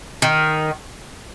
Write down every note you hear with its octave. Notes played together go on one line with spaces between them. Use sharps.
D#3